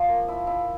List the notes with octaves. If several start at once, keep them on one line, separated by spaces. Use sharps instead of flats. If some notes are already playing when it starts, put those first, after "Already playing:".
Already playing: F3
A#3
E4
E4